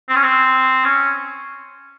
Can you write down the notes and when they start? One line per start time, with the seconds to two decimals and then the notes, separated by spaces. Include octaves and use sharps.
0.08 C4
0.15 C#4
0.23 C4
0.85 C#4